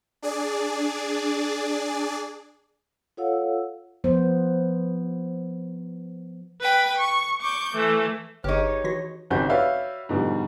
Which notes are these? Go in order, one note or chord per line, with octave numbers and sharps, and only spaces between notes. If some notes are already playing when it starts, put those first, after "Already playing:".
D4 G#4 D5
F4 A4 C#5 F5 F#5 E6
F3 B3 C5
B4 G5 B5
C#6
C#6 D6 G6
E3 A3
G1 D#4 G4 G#4 B4 C#5
E3 F#4 A#6
G#1 G#2 C#3 C4 F#4 G6
F#4 B4 C#5 D5 E5 F5
G#2 B2 D3 F3 G3